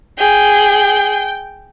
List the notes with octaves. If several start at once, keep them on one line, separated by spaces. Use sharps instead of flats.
G#4 G5